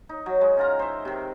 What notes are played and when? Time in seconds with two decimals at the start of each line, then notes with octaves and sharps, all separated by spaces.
0.09 D#4
0.26 F#3
0.41 G#3
0.57 C#4 F4 A#5
0.79 C5 E5
1.05 C3 D#3